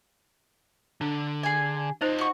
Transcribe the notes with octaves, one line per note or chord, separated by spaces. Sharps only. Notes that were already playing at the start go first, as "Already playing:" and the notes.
D3 D4
G#4 G#5
D#4 F4 C5 D#5
F#4 C#6